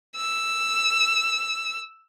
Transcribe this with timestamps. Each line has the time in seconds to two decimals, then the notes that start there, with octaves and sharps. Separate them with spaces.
0.16 E6